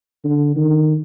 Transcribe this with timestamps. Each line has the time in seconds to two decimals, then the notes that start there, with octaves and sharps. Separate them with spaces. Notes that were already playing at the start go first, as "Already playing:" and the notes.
0.25 D3
0.56 D#3